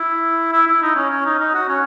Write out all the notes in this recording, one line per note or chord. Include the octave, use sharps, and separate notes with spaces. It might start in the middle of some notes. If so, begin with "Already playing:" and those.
Already playing: E4
E4
E4
D#4
C#4
C#4
D#4
D#4
F#4
C#4